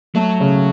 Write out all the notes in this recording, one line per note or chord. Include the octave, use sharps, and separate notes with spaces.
F#3 A3
C#3